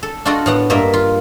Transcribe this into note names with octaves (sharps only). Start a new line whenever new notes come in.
A4
D4 F4 F#4 A4 D5 D#5
A2 B3 F#5
G2 A#3 D#5 E5
F4